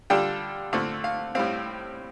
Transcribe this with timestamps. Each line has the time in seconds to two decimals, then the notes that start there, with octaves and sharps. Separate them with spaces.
0.10 D3 G3 D4 F4 G5
0.73 D3 A3 C4 F4 F5
1.04 F5
1.35 A2 G3 C4 F5